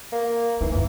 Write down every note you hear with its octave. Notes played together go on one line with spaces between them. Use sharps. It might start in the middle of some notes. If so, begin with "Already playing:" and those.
A#3
E3 D#4
G1 F#2 E3